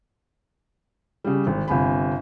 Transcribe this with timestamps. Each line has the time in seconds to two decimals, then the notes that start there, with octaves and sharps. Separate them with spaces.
1.24 C#3 G3
1.47 G#1
1.68 G1 C3 G#5 B5